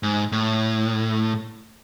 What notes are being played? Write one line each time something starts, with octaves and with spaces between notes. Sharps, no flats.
G#2
A2